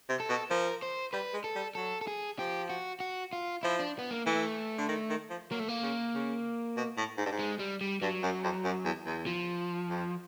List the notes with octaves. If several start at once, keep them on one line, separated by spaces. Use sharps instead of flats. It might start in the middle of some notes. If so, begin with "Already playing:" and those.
C3
A4
B2
F3 A#4
C5
G3 B4
G#3
A4
G3
F#3 A4
A4
G#4
F3 G4
F#4
F#4
F4
F3 E4
D4
B3
A#3
E3 A3
D3
D#3
D#3
F3
F#3 A#3
A3
A#3
C#3
C#3
B2
A2
G#2
G2
G#2
G#3
G3
G3
G2 F#3
F#2
F2
F#2
E2
E2
F3
F2